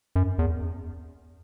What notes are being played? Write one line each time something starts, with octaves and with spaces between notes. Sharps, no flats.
F#2
E2